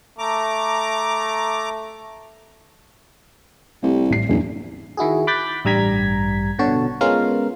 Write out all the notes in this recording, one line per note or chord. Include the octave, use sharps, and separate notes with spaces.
A3 A#5 D6
C2 A3 G4
A1 G3 C7
F#1 E2 G2 A#2
D#3 E4 F#4 G#4
B5 D6 F#6 G6 A6 B6
A1 G2 G3 A#5 G#6 B6
B2 D3 F#4 C#5 A5
G#3 B3 C#4 F4 A#4 F5